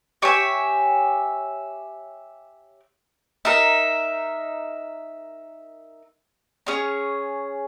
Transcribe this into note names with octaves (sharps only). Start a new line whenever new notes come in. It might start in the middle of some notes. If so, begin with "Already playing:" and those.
G4 C#5 E5 G#5
D#4 A#4 E5
C#4 G#4 C#5